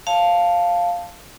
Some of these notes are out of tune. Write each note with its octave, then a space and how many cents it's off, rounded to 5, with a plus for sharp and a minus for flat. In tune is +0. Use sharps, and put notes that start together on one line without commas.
C#5 -15 F5 +0 A5 +0